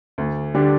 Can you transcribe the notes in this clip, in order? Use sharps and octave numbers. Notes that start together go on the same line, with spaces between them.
D2
D3 G3 D4 G4